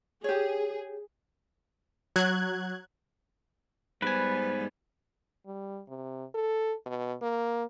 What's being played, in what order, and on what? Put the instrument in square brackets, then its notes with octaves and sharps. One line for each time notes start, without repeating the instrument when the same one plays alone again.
[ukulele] G4 C#5 [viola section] G#4
[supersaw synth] F#3 F#6 G#6
[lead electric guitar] G#2 G#5 [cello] G3 B3 [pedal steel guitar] B4 [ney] C5
[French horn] G3
C3
A4
B2
A#3